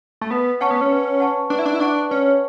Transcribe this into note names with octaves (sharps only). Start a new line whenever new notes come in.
A3
B3 B4
C#4 F#5 A5 C#6
B3
C#4
B4
F#5 A5 C#6
D4 B4
E4
D4
E4
D4 F#5 A5 C#6
C#4 B4